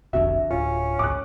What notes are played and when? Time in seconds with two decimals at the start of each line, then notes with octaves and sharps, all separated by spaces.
0.13 F1 B1 F2 D3 F#4 E5
0.50 D1 C#4 F4
0.99 G#1 C#2 D6 D#6 F#6